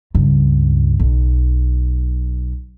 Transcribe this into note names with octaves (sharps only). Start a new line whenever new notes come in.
C#2 G2
B1